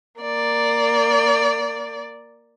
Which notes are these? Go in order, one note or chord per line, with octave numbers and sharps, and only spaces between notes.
A#3 D5